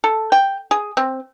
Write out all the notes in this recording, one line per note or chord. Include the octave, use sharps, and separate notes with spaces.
A4
G5
G#4
C4